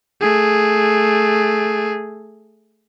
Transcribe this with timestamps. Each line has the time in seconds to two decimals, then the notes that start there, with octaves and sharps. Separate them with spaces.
0.21 A3 G#4